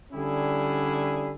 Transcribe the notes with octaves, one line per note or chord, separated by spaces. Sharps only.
D3 G3 C#4 E4 G#4